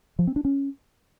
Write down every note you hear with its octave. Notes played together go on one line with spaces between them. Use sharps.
F3
C4
D4
C#4